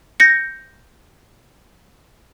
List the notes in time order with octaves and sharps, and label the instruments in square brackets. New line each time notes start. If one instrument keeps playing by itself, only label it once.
[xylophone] G6 A#6 C#7